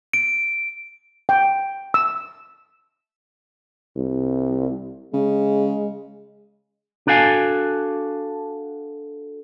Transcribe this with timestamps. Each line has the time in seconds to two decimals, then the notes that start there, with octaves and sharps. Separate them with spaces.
0.13 D7
1.29 G5
1.94 E6
3.96 C2
5.13 C#3 G#3
7.07 D4 F#4 A4 F5 G#5